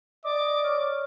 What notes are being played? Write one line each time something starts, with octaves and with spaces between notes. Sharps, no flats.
D5 D#5 D6
C#5 C#6 F6